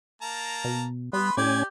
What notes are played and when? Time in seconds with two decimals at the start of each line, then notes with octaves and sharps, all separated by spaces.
0.22 A#3 A5 A#5
0.64 B2
1.13 G3 B3 B4 B5 C6
1.37 A2 C#4 G4 D5 G#5